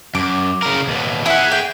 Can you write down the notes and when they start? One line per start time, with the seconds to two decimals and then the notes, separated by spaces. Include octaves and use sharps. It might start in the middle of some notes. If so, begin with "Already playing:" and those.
0.15 F#2 D6
0.62 C#3 A#4
0.87 D#2 B2
1.26 E4 G#4 E5 F#5
1.52 G5